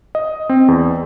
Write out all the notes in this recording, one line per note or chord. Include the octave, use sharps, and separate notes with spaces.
D#5
C4
E2